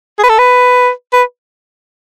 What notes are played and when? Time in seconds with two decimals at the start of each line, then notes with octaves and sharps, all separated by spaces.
0.19 G#4
0.24 B4
0.29 A4
0.39 B4
1.13 B4